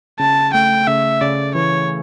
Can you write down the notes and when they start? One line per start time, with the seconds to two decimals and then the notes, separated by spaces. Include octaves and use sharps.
0.19 C#3 A5
0.54 A3 G5
0.87 C#3 E5
1.21 C#3 D5
1.55 E3 C#5